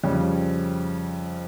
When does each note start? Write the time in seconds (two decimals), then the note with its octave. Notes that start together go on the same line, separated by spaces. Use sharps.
0.03 F2 C#3 G3 C#4